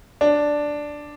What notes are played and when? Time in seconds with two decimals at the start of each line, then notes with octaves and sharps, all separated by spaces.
0.21 D4